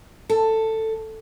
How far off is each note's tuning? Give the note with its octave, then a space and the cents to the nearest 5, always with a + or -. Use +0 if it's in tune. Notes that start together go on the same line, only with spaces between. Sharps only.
A4 +10